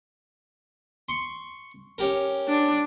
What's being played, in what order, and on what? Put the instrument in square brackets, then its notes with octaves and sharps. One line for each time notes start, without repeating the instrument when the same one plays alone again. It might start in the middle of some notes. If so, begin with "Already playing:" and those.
[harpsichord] C6 C#6
C#4 G4 A#4
[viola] D4